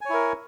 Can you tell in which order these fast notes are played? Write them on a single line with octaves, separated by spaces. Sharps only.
G#5 C#5 E4 A#4